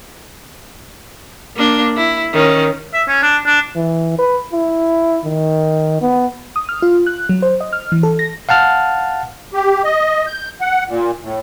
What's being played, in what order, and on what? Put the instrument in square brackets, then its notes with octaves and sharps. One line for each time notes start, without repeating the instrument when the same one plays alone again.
[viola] A#3 D4
E4
D#3 C#4
[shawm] E5
C#4
D4
D4
[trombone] E3
B4
E4
D#3
B3
[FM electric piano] D#6
F6
F4
F#6
F#3
C5
D#5
F6
E3
A4
A#6
[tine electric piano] F5 F#5 A5 F6
[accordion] G4
D#5
G6
F#5
A#2
A2